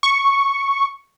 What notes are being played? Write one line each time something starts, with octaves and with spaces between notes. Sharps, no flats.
C#6